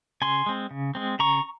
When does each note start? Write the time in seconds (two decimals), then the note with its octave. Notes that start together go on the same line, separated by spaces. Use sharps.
0.22 C#3 G#5 C6
0.46 G#3 C4
0.71 C#3
0.95 G#3 C4
1.19 C#3 A#5 C#6